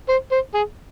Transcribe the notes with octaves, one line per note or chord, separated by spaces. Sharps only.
C5
C5
G#4